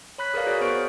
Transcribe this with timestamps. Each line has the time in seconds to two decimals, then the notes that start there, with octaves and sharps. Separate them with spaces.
0.18 C#5 B5 F#6 B6
0.34 G#4 A#4 B4 D5 F5
0.47 F#4 G#4 A#4 C#5 D5
0.61 B3 C5 C#6 D7